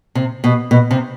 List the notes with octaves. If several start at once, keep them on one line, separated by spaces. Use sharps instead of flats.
C3
B2
B2
C3